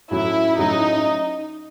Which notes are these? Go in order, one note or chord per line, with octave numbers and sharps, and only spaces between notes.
A2 F#3 C#4 E4 F#4
A2 F#3 C#4 D#4 F#4